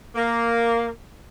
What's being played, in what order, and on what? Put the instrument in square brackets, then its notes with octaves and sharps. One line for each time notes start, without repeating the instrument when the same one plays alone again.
[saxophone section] A#3